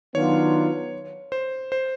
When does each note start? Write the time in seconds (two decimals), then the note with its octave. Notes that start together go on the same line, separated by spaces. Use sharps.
0.15 D#3 F#3 B3 D4 F4 C#5
1.32 C5
1.72 C5